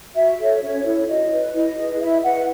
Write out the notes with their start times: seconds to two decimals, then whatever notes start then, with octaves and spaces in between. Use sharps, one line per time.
0.15 F#4 E5
0.39 A4 C#5
0.62 C#4 C#5
0.85 E4 A4 C#5
1.08 F#4 D#5
1.31 B4
1.54 E4 D#5
1.78 G#4 B4
2.01 E4 E5
2.24 B4 F#5